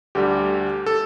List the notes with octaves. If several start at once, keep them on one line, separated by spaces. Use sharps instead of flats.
D2 D3 G3 G4
A4